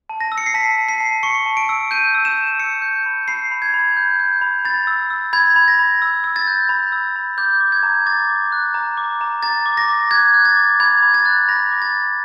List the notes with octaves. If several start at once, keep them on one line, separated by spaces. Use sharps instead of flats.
A5
A#6
E6
C#7
C7
A5 B6
A5
C7
A5
C#6 C#7
A5
D7
E6
G6 D#7
E6
E7
G6
E6 C#7
G6
B5
B5 C7
B5
G#6
B5
G6
G6
B5
B5 A6
E6
E6
B5 G#6
B5
A#6
B5
E6
E6
A6
G6
B5
E6
B5
D6 G6
D6
G#6
A#5
D6 A6
D6
F#6
A#5
D6
A#5
A#5 A6
D6
A#6
D6
F#6 G#6
F#6
A6
D6
B5 G#6
B5
A6
F#6
B5 A#6
D6
A6
D6